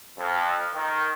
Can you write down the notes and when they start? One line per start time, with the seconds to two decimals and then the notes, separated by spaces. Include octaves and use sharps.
0.18 F2
0.74 D#3